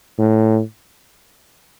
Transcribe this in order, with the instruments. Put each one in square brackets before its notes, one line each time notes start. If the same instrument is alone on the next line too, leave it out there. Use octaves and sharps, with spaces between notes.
[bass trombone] A2